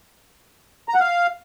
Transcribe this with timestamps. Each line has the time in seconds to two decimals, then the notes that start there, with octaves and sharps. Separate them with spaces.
0.89 A#5
0.94 F#5
1.00 F5